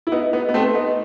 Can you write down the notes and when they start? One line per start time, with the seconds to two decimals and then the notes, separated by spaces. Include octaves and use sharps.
0.07 E4
0.12 B3 D#4
0.33 B3 D#4
0.49 B3
0.54 A3 C4
0.75 B3 D#4